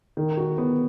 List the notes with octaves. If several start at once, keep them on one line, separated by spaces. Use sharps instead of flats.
D#3
F#4
B3